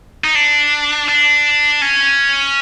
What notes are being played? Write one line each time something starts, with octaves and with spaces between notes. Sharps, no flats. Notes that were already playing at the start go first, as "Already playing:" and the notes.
D#4
D4
D4
C#4